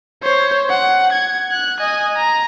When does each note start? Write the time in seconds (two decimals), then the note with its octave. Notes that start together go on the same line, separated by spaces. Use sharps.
0.23 C5 C#5
0.70 F#5
1.13 G#6
1.52 F#6
1.80 D#5 G#5
2.17 A#5